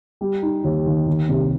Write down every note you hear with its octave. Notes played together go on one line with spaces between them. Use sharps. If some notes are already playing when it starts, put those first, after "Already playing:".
G3
D#4
D#2
D#3
D#3
C2